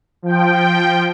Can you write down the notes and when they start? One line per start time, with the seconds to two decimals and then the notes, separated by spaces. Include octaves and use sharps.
0.22 F3 G5